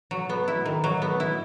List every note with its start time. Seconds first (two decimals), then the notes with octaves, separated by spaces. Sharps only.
0.11 F#3
0.29 B3
0.48 E4
0.66 D#3
0.84 F#3
1.02 B3
1.20 E4